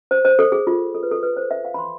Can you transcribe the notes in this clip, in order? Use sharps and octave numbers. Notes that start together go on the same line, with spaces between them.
C5
C5
A4
G#4
F4
A4
B4
A4
B4
C5
E5
F5
B5
C6